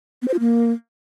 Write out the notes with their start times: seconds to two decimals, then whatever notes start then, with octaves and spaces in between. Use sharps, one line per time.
0.22 B3
0.28 C5
0.34 F4
0.40 A#3